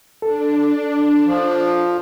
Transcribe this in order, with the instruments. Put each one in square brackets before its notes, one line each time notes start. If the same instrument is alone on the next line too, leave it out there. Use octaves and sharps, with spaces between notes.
[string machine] D4 [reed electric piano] A4
[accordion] F3